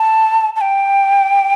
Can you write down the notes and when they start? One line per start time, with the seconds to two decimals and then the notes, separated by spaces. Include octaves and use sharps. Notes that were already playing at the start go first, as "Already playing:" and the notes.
Already playing: A5
0.56 A5
0.61 G5